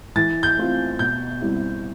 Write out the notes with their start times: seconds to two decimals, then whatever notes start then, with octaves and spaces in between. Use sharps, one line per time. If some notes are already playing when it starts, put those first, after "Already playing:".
0.16 E3 A6
0.43 G6
0.57 A3 C4 F4
0.99 B2 G6
1.41 G3 C4 E4